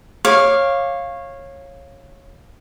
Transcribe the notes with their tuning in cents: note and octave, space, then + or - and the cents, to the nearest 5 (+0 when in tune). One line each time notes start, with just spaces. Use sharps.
C#5 -15 F5 +0 D6 +0